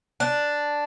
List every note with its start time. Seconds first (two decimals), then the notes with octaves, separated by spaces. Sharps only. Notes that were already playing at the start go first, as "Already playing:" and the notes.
0.20 D4